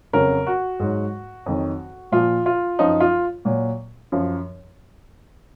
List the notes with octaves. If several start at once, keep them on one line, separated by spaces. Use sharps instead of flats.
F2 C#3 F#3 A#4
F#4
G#2 F#3
F2 D#3 F#3
A#2 F3 F4
F4
F#2 F3 D#4
F4
A#2 F#3
F#2 F3